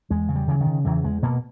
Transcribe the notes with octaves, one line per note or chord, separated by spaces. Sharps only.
E2 G#3
C#3
G3
C#3 E3
D#3
C#3
E2 E3
E2 G#3
B2 A#3